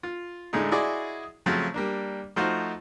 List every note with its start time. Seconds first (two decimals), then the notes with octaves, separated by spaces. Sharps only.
0.03 F4
0.53 A2 D3 G#3 A3 D#4
0.71 E4 F#4 G#4 D5 D#5 C6
1.46 C#3 F3 F#3 A3 C4
1.74 G3 A#3 D4
2.36 F3 A3 D#4 F4 F#4 C5